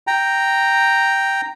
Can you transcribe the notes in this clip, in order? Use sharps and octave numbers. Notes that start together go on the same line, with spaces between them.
G5 A#5